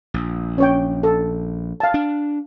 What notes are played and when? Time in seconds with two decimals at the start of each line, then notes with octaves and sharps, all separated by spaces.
0.14 A#1
0.58 C#4 C#5 G5
1.03 A4
1.80 F5 A5
1.94 D4